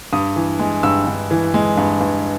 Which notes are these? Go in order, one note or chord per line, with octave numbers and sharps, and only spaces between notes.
G2 D#6
E3
G#3
G2 E6
G2
E3
G#3
G2
G2